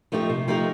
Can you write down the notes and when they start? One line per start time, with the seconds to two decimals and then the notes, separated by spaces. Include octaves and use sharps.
0.12 F3 A3 D#4 G4
0.30 C3
0.48 F3 A3 D#4 G4